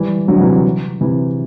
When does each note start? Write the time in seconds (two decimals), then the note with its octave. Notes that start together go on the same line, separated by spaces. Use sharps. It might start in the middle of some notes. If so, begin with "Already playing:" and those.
Already playing: E3 G3
0.28 D3 F#3
0.40 C3 E3
1.01 C3 E3